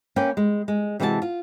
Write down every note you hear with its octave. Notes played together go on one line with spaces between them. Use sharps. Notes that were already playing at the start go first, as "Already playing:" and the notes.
A#3 C#4 B4 G5
G#3
G#3
C3 E3 G#3 F#4 D#5 A5
F4